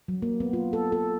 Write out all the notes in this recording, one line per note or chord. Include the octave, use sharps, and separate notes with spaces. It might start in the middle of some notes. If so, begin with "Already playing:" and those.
F#3
A#3
B3
F4
A4
A4